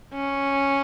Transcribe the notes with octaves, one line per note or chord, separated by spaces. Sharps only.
C#4